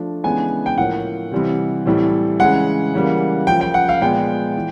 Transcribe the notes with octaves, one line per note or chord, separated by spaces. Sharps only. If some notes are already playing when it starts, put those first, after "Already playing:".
Already playing: F3 A3 D4
C#3 E3 G#3 B3 D4 G#5
G5
A2 F3 A#3 C#4 F#5
C3 E3 G3 C4
A2 E3 G3 C4
C#3 E3 G#3 F#5
C#3 E3 G3 A#3
C#3 F3 A#3 G5
G5
F#5
F5
A#2 F3 G#3 B3 G5
E3